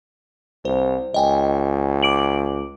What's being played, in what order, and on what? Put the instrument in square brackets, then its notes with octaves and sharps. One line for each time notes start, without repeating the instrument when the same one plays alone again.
[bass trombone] C2 [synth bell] C5
[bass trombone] C#2 [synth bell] D#5 G5 G#5
[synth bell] D6 D7 F#7